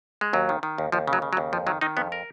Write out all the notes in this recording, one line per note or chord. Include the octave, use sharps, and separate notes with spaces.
G#3
D#2 F#3
D#3
D#3
D#2
D#2 F3
C#3
F#3
C#3
F#3
D#2
F2 F3
D#3 F#3
D#3 D#4
F2 B3
A#4